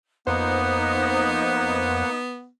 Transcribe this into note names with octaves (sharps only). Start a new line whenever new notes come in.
F2 A#3 B3 D#4 B4 C5 F#5